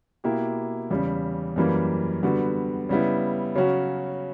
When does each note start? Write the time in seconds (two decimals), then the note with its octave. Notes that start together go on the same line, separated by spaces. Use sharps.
0.24 B2 A#3 E4 G4
0.91 E2 C#3 G3
1.56 F#2 E3 G3 A#3
2.23 D3 G3 B3 F#4
2.89 C#3 G3 B3 E4
3.55 C#3 F#3 C#4 F#4